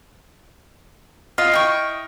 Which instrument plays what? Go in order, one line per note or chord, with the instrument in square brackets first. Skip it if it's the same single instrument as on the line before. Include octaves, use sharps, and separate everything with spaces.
[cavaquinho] F4 [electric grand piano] D#5 F6
[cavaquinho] E4 G5 C#6